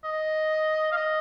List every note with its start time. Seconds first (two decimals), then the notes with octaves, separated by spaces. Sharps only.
0.04 D#5
0.92 F5
0.97 D#5